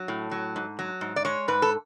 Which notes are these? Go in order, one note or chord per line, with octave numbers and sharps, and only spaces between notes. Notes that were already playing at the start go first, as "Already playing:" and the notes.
Already playing: F#3
A2
F#3
G#2
F#3
G#2
D5
G#3 C#5
G#2 B4
A4